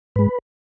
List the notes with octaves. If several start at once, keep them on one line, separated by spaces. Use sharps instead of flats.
G#2 G#3 B4